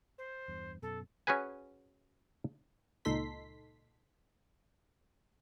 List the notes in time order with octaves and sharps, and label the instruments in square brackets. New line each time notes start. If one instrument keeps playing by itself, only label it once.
[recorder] C5
[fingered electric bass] E2 G2
[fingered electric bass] F#2 B2 [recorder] A4
[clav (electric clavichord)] C#4 F#4 G#4 B4 G#5
[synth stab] C#2 A#2 D#4 A4 C6 B6